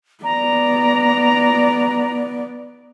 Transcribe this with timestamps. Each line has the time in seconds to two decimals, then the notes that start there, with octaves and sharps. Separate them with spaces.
0.24 B3 D5 A#5